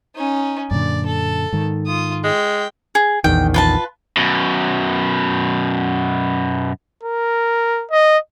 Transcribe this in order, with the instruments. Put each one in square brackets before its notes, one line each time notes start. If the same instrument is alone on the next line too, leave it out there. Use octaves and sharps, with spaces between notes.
[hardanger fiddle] C#4 D#4
[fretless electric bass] F#2 A#2 D3 [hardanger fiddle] D5
[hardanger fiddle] A4
[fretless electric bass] G#2 D#3
[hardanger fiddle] F4 D#6
[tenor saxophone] G#3 [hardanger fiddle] G5
[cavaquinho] G#4
[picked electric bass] A#1 E2 D#3 [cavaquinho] G5
[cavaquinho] F4 B4 A5
[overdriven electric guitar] F#2 B2
[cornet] A#4
D#5